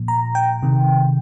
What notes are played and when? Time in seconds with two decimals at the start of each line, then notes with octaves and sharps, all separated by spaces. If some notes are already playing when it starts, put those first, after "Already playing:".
Already playing: A#2 F3
0.08 A#5
0.35 G5
0.63 C3 D#3